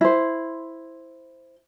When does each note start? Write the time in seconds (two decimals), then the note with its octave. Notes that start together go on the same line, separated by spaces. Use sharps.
0.01 E4 C5